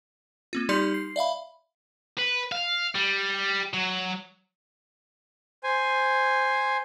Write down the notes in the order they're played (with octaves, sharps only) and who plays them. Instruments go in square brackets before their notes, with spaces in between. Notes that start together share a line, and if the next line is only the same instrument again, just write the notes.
[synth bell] A#3 C4 F4
G3 D#4 G4 D5 C6 G6
C7
D5 E5 F5 B5
[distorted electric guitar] B4
F5
G3
F#3
[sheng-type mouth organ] C5 G#5